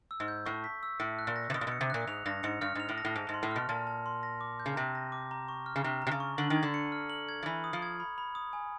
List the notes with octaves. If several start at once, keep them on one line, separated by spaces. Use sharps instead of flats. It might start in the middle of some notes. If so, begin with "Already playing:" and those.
E6
G#2
G6
A2 C#6
B6
E6
A2 C#7
F#6
A#2
A#6
C3
B2 D#6
A#2
B2 C#7
C3
A#2 F#6
G#2 F7
G2 A#6
G#2 C#7
G2 F6
G#2 F7
A2
A#6
A2
G#2 A5
G#2
C6
A2
B2 F6
A#2 A5
A5
C6
A#6
D6
G6
C#3
C3 A#5
A#6
D6
A#5
C#6
F6
C#3
C3 A#5
C3 A#5
C#3
C#6
D3 F#7
D#3
G#6
D3
C#7
F6
F#7
G#6
F3
E3 B5
D#6
F3
G#6
B5
B5
D#6
G#5